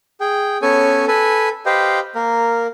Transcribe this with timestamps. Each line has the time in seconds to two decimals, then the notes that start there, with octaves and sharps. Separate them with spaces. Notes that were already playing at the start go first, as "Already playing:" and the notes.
0.21 G#4 G5
0.62 B3 C#4 A4 C#5 G#5
1.08 A4 B4 G#5
1.66 G4 B4 C5 D#5 F5 G5
2.15 A#3 A#4